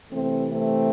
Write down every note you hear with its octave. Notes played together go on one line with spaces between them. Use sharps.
C3 E3 A3 C4
A3 C4